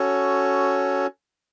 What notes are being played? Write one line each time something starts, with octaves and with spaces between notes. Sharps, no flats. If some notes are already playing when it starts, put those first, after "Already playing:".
Already playing: C#4 F#4 A4 C#5